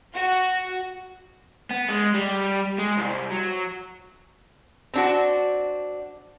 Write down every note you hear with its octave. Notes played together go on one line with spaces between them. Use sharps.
F#4
B3
G#3
G3
G#3
C2
F#3
C4 D4 F#4